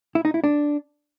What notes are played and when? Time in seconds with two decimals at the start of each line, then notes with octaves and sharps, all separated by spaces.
0.15 E4
0.25 D#4
0.34 E4
0.44 D4